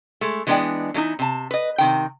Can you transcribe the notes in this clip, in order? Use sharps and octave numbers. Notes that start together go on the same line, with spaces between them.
G#3 A3
E3 G#3 B3 D4 D#5 G5
E3 F#3 A#3 D#4 E4
C3 A5
B4 D#5
C3 D#3 G5